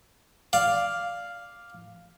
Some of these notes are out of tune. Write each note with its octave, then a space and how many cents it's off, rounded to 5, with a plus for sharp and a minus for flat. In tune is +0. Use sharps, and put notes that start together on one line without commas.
D5 +0 F5 +0